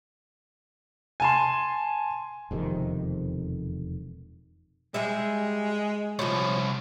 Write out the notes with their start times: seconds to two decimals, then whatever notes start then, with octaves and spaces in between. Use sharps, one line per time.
1.20 G#5 A5 C6
2.51 E1 F2 C3 D#3
4.94 G3 G#3 G#4 E5
6.19 C2 F3 C#4